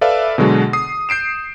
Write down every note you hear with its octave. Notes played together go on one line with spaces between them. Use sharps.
A4 B4 D5 E5 F5
B2 D3 F#3 G#3 F#4
D#6 C7
G6 C7 D7 E7